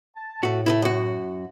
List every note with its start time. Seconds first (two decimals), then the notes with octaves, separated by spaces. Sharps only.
0.15 A5
0.43 A2 A3 F#4
0.66 A3 A#3 E4
0.82 F#2 F#4